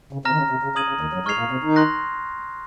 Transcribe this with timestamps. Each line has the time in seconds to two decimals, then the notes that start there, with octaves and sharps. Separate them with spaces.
0.13 C#3
0.25 C3 A#5 F6 A#6
0.32 D#3
0.38 C#3
0.50 C3
0.63 C#3
0.76 C#3 D#6 G#6 D#7 F#7
0.88 C#3
1.01 D#2 D#3
1.13 F#2 F#3
1.26 G#2 G#3 C#6 F6 G#6 C7 F7
1.39 A#2 A#3
1.51 C3 C4
1.64 D#3 D#4
1.76 C6 F#6 A#6